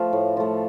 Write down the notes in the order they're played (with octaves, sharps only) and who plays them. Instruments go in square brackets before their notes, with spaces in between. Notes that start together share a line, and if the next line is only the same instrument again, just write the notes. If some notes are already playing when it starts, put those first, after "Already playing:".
Already playing: [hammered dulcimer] F3 A3 F5
A2
F3 A3